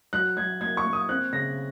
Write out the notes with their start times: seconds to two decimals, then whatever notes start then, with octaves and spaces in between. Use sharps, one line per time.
0.13 F#3 F#6
0.37 F#3 G#6
0.61 A#3 G#6
0.77 C#6
0.85 A#3
0.93 D#6
1.09 C4 F#6
1.33 C#3 A#6